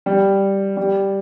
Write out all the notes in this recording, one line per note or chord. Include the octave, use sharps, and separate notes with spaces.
G3
G3